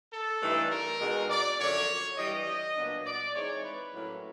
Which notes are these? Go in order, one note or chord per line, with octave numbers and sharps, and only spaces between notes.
A4
G2 E3 A3 C4 D#4
A#4
B2 G#3 C4 D#4
D5
F#2 D3 F3 C#5
G2 E3 G3 D#5
A#2 F#3 B3 D4
D5
E3 G#3 C4 D#4 C#5
B4
A2 F#3 A#3 C#4